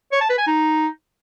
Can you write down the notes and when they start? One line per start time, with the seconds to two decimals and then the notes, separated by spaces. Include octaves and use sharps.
0.13 C#5
0.21 A5
0.30 B4
0.38 G#5
0.47 D#4